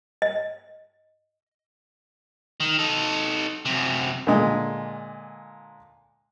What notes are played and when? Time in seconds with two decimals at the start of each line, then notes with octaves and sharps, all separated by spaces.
0.22 D#5
2.60 D#3
2.79 D#4 A4
3.65 F#2 C3
4.27 A#2 D3 G#3